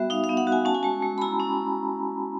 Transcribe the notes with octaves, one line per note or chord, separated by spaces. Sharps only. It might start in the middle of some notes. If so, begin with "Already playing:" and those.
Already playing: G3 B3 F#4 E5
D#4 F5
F5
B3
F#5
F#4
G#5
C#4 A5
G#5
G#3 A5
G#3
B5
E4 A#5
C#4